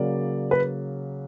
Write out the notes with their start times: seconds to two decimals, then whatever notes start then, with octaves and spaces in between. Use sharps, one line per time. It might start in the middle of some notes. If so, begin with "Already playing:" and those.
Already playing: C#3 F#3 A#3 D5
0.51 B4